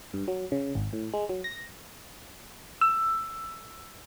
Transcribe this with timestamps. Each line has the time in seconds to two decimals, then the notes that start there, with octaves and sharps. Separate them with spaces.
0.14 G2
0.28 F#3
0.52 C#3
0.75 G#1
0.93 A2
1.14 G#3
1.29 F#3
1.44 A#6
2.81 E6